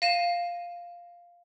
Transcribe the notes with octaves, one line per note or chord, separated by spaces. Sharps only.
F5 A#6 D#7 E7